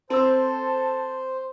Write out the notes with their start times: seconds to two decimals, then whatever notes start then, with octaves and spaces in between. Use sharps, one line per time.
0.10 C4 A4 C5 E6